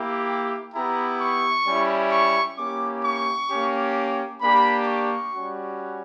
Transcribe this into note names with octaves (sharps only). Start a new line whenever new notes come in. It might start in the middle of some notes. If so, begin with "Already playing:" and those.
Already playing: A#3 E4 G4
G5
B3 E4 G4 A#5
C#6
G3 C#4 E4
C#6
A#3 C#4 E4 G4 D6
C#6
A#3 C#4 G4
A#3 D4 G4 B5
C#6
G3 C#4 F#4